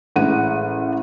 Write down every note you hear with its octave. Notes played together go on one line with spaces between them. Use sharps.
A1 G#3 F#5 D#7